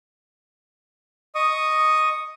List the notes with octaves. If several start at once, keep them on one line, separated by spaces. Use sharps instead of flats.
D#5 C#6 D#6